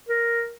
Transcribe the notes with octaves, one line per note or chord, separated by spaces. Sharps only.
A#4